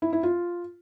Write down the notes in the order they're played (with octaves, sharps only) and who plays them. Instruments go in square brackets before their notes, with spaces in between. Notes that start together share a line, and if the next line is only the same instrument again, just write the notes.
[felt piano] E4
E4
F4